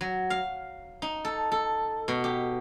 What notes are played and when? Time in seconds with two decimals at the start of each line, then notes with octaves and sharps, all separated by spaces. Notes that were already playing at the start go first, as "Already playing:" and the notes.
0.01 F#3
0.30 F5
1.02 D#4
1.25 A4
1.52 A4
2.08 B2
2.24 G4